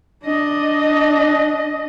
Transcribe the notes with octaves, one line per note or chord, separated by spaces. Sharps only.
D4 D#5